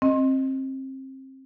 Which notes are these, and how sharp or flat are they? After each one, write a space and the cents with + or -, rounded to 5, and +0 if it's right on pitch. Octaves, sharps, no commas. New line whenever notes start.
C4 +30 D#5 +0